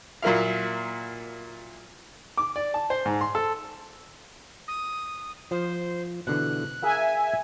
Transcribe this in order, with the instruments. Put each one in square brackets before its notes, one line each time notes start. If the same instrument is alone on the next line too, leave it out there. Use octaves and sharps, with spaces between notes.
[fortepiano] A#2 F#3 A#3 E4 F5
D6
D5
A5
C5
G#2
C6
A4
[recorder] D#6
[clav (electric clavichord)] F3 [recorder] C5
[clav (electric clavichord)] B2 D3 E3 [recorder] F#6
[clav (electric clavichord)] G#4 A#4 F5 [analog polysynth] E5 G#5